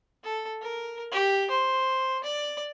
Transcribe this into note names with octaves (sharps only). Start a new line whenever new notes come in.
A4
A#4
G4
C5
D5